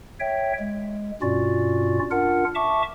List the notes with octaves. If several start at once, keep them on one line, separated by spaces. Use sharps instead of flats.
C#5 E5 G5
G#3
G2 B2 C#4 F4 F#4 D5
D4 F4 A#4 F#5
E5 A5 C#6 D6